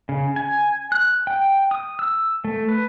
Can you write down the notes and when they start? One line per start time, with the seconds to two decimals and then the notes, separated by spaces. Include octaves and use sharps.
0.09 C#3
0.36 G#5
0.92 F#6
1.27 G5
1.71 D#6
1.99 E6
2.45 A3
2.68 B4